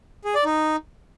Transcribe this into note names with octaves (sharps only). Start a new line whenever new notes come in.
G#4
D5
D#4